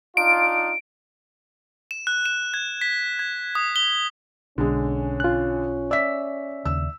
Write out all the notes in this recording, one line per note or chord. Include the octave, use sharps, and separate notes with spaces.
D4 D#4 F4 D7
E7
F#6
E7
G#6
B6
G#6
D#6
G7
B1 D3 G#3 C#4
F4 F#6
D5 E5 E6 B6
D#2 C#3 E6